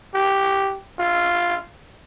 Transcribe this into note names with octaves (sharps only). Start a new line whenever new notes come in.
G4
F4